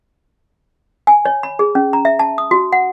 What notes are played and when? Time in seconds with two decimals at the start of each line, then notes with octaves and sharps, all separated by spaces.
1.07 G#5
1.25 C#5
1.43 B5
1.59 G#4
1.75 C#4
1.93 A#5
2.05 E5
2.19 A5
2.38 D#6
2.51 F#4
2.73 F#5